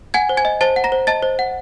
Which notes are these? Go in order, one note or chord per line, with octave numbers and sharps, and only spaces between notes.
F#5 G#5 G#6
C5
G#5 G#6
D#5
C5 A5 A6
F#5
A#5 A#6
C5
D#5 A5 A6
C5
F#5